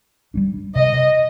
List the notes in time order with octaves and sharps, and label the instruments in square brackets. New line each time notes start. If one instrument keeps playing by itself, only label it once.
[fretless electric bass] G3 A#3 D4
[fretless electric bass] C3 [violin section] D#5